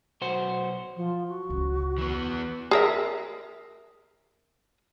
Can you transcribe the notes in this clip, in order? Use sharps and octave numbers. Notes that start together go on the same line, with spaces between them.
B1 F#4 C5
F3
F#4
C#2 C#3
E3 B3
G#4 A#4 E5